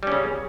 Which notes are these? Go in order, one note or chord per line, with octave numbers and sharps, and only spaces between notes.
C#3 G3 C#4